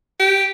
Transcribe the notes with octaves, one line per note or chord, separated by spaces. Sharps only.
G4